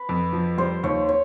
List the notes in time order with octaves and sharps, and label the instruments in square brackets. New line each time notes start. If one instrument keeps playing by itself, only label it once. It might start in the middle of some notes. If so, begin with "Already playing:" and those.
Already playing: [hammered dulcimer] B4
[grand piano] F2
F3
[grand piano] G3 [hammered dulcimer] C5
[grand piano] D#2 [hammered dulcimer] C#5
[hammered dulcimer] C#5